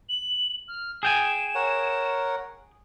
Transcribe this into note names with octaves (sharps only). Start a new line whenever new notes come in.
F#7
F6
G#4 G5 G#5 E7
A#4 C#5 F#5